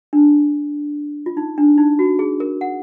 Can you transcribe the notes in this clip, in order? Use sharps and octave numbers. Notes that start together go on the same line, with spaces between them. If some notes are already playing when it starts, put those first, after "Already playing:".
D4
F4
D#4
D4
D#4
F#4
G#4
A#4
F#5